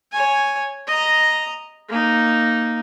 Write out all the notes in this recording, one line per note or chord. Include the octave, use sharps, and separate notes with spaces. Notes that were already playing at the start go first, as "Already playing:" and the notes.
C#5 G#5
D#5 A#5
A#3 D#4